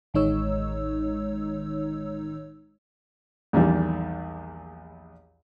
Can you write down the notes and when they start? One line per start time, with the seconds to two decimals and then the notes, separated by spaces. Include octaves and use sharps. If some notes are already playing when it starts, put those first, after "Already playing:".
0.14 A1 D#3 G#3 D#4 C#5 E6
3.53 A#1 E2 D#3 G3